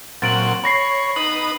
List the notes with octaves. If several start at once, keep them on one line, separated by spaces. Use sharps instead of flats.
A#2 F#3 C4 A6 D7 F#7
C#5 B5 A#6 C7
D#4 B4 D#6 F#7